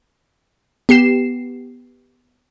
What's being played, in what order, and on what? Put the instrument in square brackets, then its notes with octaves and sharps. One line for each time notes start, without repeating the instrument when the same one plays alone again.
[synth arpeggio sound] B3 G4 C7 E7